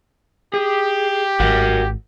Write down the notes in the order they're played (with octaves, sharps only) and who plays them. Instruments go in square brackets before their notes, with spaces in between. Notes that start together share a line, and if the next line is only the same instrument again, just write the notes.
[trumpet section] G4 [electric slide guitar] G#4
[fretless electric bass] G#1 [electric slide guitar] F#4 A#4 F#5